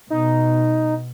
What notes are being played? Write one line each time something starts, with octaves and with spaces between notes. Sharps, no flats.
B2 D#4